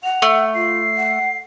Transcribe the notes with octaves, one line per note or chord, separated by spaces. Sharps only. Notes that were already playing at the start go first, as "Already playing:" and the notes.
F#5 F7
A3
F4 C7
F#5